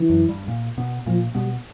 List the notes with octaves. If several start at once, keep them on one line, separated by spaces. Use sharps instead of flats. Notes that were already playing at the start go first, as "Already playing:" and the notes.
Already playing: E3
F#2 F#3
G2 G3
A#2 A#3
B2 B3
A#2 F3 A#3
B2 G3 B3